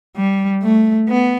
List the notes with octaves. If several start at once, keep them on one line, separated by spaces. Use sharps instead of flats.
G3
A3
B3